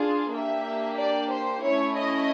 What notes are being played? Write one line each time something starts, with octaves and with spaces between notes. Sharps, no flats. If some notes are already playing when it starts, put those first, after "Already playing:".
Already playing: D4 F4 G#4
A#3 D4 G4 E5
D5
C5
A3 C#4 E4 C#5
D#5